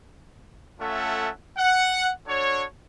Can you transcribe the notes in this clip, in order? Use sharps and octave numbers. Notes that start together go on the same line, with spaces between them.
A3 C#4 F4 A4 E5 F#5
F#5
D4 F#4 A4 C#5